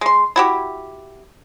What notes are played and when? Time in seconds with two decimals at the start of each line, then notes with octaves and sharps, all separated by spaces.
0.01 G#3 C6
0.36 E4 F#4 G4